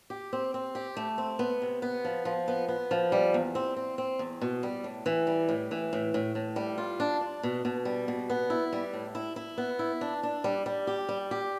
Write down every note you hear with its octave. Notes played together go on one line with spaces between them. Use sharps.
G4
C4
C4
G4
A3
C4
B3
C3
B3
F3
F3
B3
B3
F3
G3
E2
C4
C4
C4
E2
B2
G3
A2
E3
G3
A2
E3
A2
A2
A2
G3
F4
D4
D4
B2
B2
G3
B2
B3
E4
G3
A2
E4
E4
B3
E4
D4
D4
G3
G3
G4
G3
G4